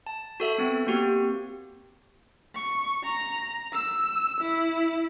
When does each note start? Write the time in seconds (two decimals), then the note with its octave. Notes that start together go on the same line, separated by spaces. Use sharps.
0.06 A5
0.40 F#4 A4 E5
0.58 B3 C4
0.87 A#3 C4 F#4 G4
2.55 C#6
3.03 A#5
3.72 E6
4.41 E4